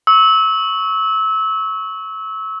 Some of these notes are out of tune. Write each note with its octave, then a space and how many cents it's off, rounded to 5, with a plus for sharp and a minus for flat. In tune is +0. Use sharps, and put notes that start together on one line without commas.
C#6 +0 E6 -25